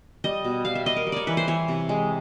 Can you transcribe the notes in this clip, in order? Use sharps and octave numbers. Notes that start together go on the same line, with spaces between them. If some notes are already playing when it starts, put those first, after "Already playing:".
G3 D#5
B2
G3 F5
E5
G3 D#5
A#4
G3
C#5 D5
E3 B4
C5
E3 C#5
C3
G#3